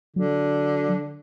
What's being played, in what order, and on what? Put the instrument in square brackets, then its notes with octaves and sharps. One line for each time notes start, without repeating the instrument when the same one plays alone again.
[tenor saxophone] D3 [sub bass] F#3